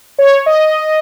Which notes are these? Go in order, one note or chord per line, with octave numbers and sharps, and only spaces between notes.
C#5
D#5